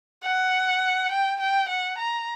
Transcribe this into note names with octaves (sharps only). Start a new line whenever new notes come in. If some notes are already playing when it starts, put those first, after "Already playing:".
F#5
G5
G5
F#5
A#5